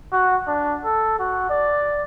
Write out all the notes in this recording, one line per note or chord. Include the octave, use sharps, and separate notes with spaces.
F#4
D4
A4
F#4
D5